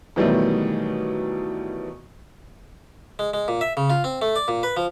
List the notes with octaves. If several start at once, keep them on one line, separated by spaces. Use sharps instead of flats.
B2 D#3 E3 F#3 G3 A3
G#3
G#3
A#2
E5
C#3
F4
C4
A3
D5
A#2
B4
F3